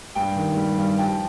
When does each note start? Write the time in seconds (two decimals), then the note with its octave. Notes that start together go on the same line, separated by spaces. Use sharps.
0.15 G2 G5
0.36 D#3
0.57 G3
0.78 G2
0.98 F3 G5